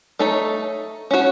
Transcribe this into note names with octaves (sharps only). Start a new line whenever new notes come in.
A3 D#4 A4 C#5
C#4 F#4 C#5